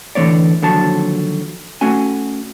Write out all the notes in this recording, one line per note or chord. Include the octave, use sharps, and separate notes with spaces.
A2 D3 E3 B3 C#5 D5
D#2 D3 F3 F#3 A5
A3 C#4 F#4 G#5